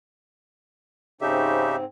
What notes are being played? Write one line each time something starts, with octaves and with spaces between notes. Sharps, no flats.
G#2 C#3 C4 D#4 G4 E5